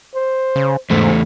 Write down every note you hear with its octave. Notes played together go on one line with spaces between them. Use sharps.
C5
C#3
E2 G#2 A3 C5